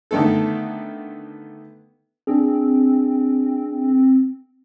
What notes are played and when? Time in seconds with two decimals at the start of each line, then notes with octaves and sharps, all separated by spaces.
0.11 D3 D#3 A3 B3 A4
2.27 C4 D4 G#4